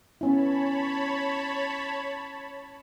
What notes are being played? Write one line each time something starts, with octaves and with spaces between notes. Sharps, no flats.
B3 C#4 E4 C#5 A5 B5